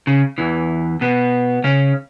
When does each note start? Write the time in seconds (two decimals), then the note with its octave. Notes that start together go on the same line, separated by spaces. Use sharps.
0.07 C#3
0.38 E2 E3
1.01 B2 B3
1.64 C#3 C#4